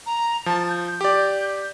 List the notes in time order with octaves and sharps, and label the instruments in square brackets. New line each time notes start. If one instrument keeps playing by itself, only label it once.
[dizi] A#5
[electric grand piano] F3 [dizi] A5
[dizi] G6
[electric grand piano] G4 D5